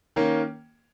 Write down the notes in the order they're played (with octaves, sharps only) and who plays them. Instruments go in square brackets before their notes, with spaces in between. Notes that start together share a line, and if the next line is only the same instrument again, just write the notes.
[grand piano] D#3 A#3 C#4